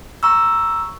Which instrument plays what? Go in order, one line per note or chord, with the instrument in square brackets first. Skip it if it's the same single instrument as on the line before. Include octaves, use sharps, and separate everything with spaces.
[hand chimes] A#5 C#6 E6